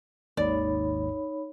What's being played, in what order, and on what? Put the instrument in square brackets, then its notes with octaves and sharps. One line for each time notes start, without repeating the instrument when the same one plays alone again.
[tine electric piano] G#1 D#2 G#2 [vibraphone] D#4 C#5 B5 [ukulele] D5